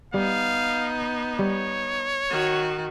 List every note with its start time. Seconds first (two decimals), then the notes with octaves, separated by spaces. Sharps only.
0.14 G3 B3 D#4 F5
1.39 G3 C#5
2.30 D#3 F#4